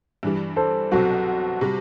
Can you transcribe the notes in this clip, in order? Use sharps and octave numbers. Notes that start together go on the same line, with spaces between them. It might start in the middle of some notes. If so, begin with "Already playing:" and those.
G2 E3 G3
A4 C5
C2 B2 F#3 C4 F#4 A4
C3 G3